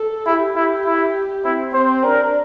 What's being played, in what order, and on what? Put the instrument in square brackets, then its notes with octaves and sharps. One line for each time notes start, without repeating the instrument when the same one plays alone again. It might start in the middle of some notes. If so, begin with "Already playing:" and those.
Already playing: [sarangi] A4
[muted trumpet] E4 [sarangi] G4
[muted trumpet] E4
E4
[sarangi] C4 [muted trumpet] E4
[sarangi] C4 [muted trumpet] C5
[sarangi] D4 [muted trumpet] A#4